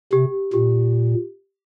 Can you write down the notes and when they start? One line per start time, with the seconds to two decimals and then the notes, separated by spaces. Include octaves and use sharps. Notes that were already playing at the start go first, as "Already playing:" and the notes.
0.12 C3 G4
0.53 A#2 G4